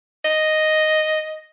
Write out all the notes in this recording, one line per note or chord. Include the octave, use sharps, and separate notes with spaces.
D#5